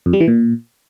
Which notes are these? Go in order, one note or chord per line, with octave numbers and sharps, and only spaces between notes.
F2
G3
E3
A#2